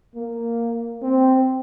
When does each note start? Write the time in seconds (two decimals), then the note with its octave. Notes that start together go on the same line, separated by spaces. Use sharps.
0.16 A#3
1.02 C4